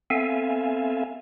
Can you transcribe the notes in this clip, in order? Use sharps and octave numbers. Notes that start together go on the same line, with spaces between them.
B3 C4 A4 E5 F5 G#5